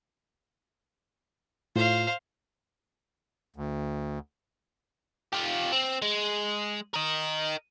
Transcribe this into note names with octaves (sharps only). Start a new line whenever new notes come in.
A2 F4 C5 F5
D2
F4 G4
C4
G#3
A#4 D#5